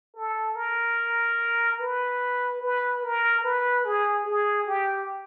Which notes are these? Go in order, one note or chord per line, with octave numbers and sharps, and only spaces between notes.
A4
A#4
B4
B4
A#4
B4
G#4
G#4
G4